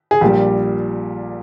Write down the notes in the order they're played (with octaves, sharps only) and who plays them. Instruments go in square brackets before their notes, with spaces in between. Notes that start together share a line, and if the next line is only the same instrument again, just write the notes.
[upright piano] G#4
A#1 A#2 G3 G4